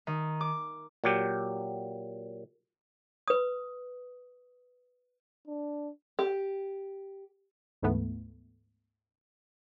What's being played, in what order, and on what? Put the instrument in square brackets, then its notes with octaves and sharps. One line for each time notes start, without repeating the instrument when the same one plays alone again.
[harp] D#3
D6
[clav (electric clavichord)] A#2 F#3 G4
[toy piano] B4 D#6
[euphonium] D4
[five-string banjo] G4
[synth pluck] D2 G#2 E3 A3 B3